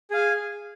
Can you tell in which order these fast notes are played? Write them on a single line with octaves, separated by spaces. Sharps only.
G#4 F5 G#5